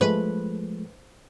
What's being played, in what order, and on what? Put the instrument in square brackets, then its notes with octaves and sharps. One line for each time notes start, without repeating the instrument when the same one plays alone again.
[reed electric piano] F3 G#3 A3 [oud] B4